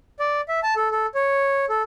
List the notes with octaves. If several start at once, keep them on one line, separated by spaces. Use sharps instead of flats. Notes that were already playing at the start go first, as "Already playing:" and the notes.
D5
E5
A5
A4
A4
C#5
A4